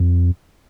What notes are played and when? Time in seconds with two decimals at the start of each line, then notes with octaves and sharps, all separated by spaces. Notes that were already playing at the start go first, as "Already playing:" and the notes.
Already playing: F2